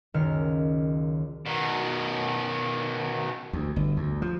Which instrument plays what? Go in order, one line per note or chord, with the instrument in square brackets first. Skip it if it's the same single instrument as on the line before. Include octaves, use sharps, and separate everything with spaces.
[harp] F#1 C#2 D#3 F6 C#7
[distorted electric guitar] B2 D#3
[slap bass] D2
G1
D2
F3